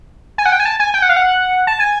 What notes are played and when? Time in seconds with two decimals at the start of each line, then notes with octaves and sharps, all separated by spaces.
0.38 G#5
0.46 F#5
0.52 G5
0.60 G#5
0.65 A5
0.80 G#5
0.94 G5
1.02 F#5
1.09 F5
1.16 F#5
1.67 A5
1.80 G#5